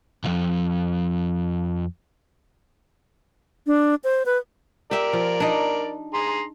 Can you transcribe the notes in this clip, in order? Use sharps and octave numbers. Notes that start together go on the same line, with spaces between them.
C2 F2
D4
C5
B4
G4 A#4 D5 E5 G5
F3
D4 D#4
G#4 A#5 C6